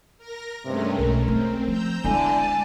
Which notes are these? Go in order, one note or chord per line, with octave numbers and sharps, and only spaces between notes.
A#4 A#6
G2 C3 G#3 A3 C#4
B1 A#4
A3 C4
F3 A#5 E6 G6
D3 G#3 B3 E4 D5 G#5 A5